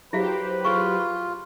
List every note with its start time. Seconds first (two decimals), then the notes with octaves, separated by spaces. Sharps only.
0.13 F#3 E4 G4 G#4 B4 C5 F5
0.65 F4 G#4 C#6